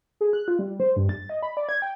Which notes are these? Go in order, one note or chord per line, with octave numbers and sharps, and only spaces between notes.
G#4
F#6
F4
G3
C5
G2
A6
D#5
B5
D5
G#6
G5